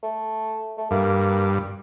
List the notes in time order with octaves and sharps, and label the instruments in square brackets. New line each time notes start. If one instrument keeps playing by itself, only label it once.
[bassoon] A3
A3
[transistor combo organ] G2 [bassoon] A#3